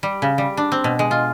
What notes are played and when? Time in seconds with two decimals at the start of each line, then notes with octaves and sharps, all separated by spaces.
0.03 G3
0.22 C#3
0.38 G3
0.57 D4
0.72 C4
0.84 B2
0.99 G#3
1.11 F4